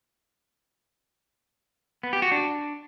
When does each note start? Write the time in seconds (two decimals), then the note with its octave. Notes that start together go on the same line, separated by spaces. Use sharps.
2.03 B3
2.13 G4
2.22 F#4
2.32 D4